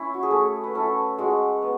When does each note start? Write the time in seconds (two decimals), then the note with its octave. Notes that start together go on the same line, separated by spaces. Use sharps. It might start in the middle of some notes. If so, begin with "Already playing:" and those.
Already playing: C#4 E4 C#5
0.14 F#4
0.23 G#4
0.31 A3 A4
0.64 B4
0.74 C#4 E4 A4
1.18 G#3 F#4
1.62 B3